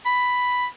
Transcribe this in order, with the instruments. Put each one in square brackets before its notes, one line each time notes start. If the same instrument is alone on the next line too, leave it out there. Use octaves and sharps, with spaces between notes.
[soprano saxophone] B5